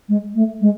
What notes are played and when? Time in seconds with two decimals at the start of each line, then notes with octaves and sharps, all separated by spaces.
0.09 G#3
0.35 A3
0.61 G#3